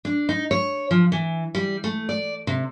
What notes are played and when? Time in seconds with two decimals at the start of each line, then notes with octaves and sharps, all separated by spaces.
0.05 D4
0.29 D#4
0.51 C#5
0.91 F3
1.12 E3
1.55 G3
1.84 A3
2.09 D5
2.47 C3